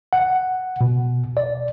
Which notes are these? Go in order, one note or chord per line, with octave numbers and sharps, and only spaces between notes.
F#5
B2
D5